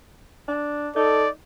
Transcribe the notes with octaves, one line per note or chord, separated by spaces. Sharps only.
D4
D#4 A4 D5